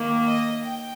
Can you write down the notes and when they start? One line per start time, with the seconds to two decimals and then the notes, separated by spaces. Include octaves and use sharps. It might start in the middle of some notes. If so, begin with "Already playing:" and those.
Already playing: D#3 A#3
0.28 D#5
0.64 G5